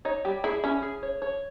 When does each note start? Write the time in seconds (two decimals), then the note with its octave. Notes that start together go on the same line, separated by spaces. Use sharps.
0.05 D#4 C#5
0.25 G3 G4
0.44 E4 G#4
0.64 C#4 E4
0.82 G#4
1.03 C#5
1.22 C#5